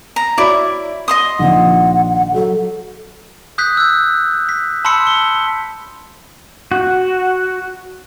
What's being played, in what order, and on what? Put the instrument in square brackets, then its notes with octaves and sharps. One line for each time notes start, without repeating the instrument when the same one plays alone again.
[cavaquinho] A#5
[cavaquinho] E4 D5 [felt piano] F#4 C#5 E5
[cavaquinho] D#5 C6 D#6
[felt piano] A#1 D#3 F3 [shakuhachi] F#5
[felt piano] F#3 [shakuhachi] A4
[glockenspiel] D#6 F#6 G6 B6
E6 G6
B6
A5 B5 C6 E6 B6 C#7
G7
[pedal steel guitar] F#4